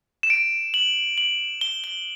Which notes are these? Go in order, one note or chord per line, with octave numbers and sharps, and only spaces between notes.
E7
D7
F#7
F#7
G7
G7